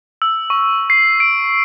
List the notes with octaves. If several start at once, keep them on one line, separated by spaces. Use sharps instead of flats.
E6
C#6
C7
D7